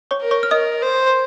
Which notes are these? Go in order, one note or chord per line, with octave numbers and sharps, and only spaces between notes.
C#5 C#6
A#4
C#5 C#6
F6
A#4 D#5 D#6
C5